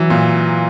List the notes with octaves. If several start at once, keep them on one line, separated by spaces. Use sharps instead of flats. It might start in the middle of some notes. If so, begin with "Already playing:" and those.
Already playing: E3 F#3
A#2